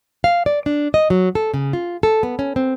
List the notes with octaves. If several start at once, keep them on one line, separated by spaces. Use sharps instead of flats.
F5
D5
D4
D#5
F#3
A4
C#3
F4
A4
B3
C#4
C4